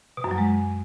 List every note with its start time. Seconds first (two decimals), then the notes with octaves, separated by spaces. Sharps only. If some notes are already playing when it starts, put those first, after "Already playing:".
0.17 B2
0.24 F#2
0.31 F#3
0.38 G#3